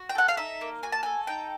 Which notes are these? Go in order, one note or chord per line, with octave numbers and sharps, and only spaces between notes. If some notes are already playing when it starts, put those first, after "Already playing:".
Already playing: F#4
G5
A4 F#5
F5
D#4 E5
A#3
F#4 G#5
A5
A4 G#5
D#4 G5